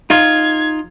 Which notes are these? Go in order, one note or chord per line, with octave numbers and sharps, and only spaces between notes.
D#4 F4 G#6